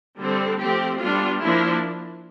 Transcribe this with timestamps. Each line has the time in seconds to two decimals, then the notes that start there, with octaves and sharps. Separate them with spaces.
0.19 D3 G3 C4 A4
0.60 F3 A3 C4 G4
0.99 G3 B3 D4 F4
1.40 F3 A#3 D4 E4